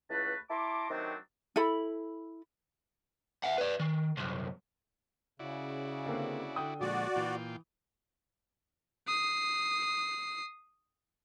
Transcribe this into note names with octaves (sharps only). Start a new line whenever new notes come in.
C#2 E3 A3 F#4 B4 A5
E4 A5 A#5 C6 D6
C3 D#3 F#3 A3 C4 D4
E4 A4 B5
E5 F#5
B4 D5
D#3
C2 F#2
C#3 E4 F#4 D5
D3 A#3 C4
D3 G5 D#6
A#2 F3 G#3 F#4 D5
A#2 E3 F4 G5
D#6 C7